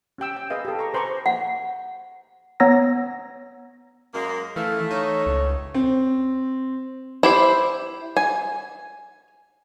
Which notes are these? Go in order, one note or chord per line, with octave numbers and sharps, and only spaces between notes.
C#4 G4 G5 E6
G5
G#4 B4 D#5 F5
G4 A4
A#5 C#6
B4 C5 G#5 A#5 C#6 D6
F#5
B3 C#5 A#5 E6 A#6
F#2 G#3 A#3
E3 A3 F5
D#4 C#5
C#2
C4
E4 G4 C5
G#5